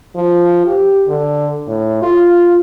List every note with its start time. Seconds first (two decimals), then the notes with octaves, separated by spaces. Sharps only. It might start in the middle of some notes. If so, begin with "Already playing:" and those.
0.16 F3
0.66 G4
1.08 D3
1.68 A2
2.02 F4